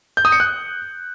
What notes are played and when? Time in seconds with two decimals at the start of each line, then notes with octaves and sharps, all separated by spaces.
0.17 G6
0.25 D#6
0.32 C#7
0.40 F#6